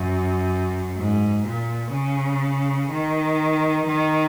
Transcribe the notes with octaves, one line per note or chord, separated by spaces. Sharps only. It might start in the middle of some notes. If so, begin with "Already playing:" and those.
Already playing: F#2
G#2
A#2
C#3
D#3
D#3